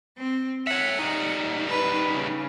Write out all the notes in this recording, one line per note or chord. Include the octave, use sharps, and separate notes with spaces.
C4
C#5 E5 F#5
G3 D#4
B4
C#3